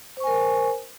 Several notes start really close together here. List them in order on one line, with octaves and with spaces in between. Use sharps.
C5 C#6 G#5 A#4